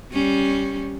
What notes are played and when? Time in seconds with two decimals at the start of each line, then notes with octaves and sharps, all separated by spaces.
0.12 G3 C#4